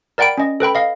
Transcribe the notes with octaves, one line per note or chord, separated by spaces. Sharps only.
A#4 D5 F#5 G5 B5 D7
C#4 D#5
A4 B4 G5 B5
D#5 F5